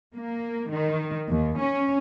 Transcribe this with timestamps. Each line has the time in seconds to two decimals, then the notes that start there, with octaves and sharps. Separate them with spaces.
0.14 A#3
0.71 D#3
1.29 D#2
1.60 C#4